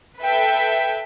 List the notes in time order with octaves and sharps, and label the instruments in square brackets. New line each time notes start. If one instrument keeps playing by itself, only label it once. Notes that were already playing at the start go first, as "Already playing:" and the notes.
[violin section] A4 B4 E5 G5